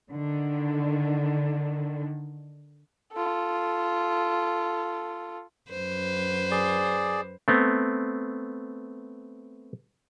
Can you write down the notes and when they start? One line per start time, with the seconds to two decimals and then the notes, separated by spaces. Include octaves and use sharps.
0.11 D3 D#3
3.13 F4 A4
5.70 F#2 B4 C5
6.51 G#4 D5
7.48 A3 B3 C4